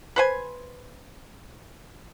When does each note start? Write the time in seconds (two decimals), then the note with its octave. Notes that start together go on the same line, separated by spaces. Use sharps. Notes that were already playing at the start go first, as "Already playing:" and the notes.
0.16 B4 C5 G#5